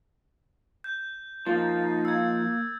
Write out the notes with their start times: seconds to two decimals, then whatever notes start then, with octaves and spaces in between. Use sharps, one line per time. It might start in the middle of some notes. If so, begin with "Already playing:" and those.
0.84 G6
1.47 F3 A#3 D#4 F5 A6
2.05 E6 G#6